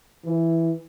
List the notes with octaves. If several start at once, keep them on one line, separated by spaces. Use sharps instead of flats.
E3